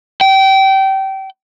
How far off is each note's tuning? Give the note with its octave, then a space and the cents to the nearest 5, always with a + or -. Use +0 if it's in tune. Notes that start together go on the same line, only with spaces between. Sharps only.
G5 -25